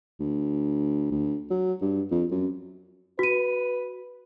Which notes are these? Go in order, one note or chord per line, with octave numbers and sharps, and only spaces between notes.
D2
D2
F#3
G2
F2
F#2
F#4 B4 D#7